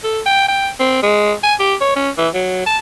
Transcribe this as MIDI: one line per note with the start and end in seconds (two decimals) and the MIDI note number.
0.04 0.20 69
0.26 0.47 79
0.48 0.70 79
0.80 0.98 60
1.03 1.33 56
1.43 1.54 80
1.59 1.75 67
1.81 1.94 73
1.96 2.10 61
2.18 2.28 52
2.34 2.64 54
2.66 2.78 81